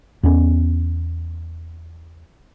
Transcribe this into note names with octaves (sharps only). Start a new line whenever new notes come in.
E2 B3 C#4